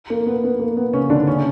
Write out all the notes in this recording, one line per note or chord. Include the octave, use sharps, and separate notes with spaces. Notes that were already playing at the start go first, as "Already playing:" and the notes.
A#3
B3
B3
A#3
B3
C#3 C#4
D3 D4
C#3 C#4